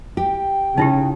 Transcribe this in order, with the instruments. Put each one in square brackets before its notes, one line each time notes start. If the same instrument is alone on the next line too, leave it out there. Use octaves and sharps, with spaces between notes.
[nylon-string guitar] G4 [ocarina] G5
[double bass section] C#3 [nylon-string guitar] C#4 [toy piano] D#4 E4 G4